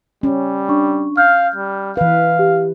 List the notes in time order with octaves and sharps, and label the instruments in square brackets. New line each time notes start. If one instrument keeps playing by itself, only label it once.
[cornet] G3 [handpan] C#4
[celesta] D4 C#6
[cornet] F5 [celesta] F6 G6
[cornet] G3
[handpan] E3 B4 [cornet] F5
[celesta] G4